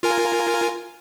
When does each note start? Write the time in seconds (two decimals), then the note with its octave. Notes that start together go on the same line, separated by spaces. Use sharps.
0.03 F4 A#4 G#5